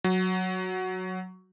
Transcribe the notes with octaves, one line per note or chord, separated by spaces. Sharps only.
F#3